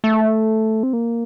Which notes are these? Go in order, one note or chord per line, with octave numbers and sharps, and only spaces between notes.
A3
C4
A#3